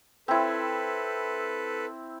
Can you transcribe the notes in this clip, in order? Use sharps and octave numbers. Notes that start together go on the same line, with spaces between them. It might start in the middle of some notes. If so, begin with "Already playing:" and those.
C4 E4 A4 B4